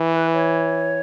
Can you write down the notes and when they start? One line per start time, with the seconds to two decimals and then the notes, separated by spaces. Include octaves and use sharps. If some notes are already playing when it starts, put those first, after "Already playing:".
Already playing: E3
0.13 B4
0.33 C#5